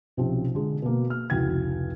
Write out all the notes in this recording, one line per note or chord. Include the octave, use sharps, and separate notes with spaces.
B1 C3 F3 C4 C#4
D3 G#3
B2 A#3
F6
F1 C#2 E4 F#4 G5 G#6